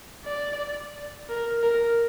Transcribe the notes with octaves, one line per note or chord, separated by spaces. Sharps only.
D5
A#4
A#4